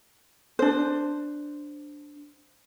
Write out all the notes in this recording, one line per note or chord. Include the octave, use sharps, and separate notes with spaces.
D4 C5